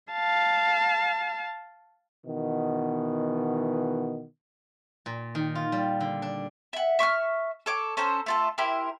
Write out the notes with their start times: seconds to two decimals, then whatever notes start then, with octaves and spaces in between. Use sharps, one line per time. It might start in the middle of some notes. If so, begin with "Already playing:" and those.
0.12 F5 A5
2.26 B2 D#3 E3 B3
5.06 A#2
5.35 D#3
5.55 F4
5.72 G3
6.00 D3
6.22 D4
6.73 E5 F#5
6.99 E5 C#6 D6 F6
7.66 A4 C#5 D6
7.97 C#4 A4 C5 A#5
8.26 A3 F4 A4
8.58 E4 G4 A#4 C5